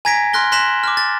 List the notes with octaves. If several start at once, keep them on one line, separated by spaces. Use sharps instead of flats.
G#5 A#5 G#6 A#6 B6 D7
C6 F6 F#6 A#6 G7
C6 F#6 A#6 B6 E7 F#7
D6 F6
A6